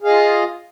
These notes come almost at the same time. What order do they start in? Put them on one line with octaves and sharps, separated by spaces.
G#4 F5 D#5 F4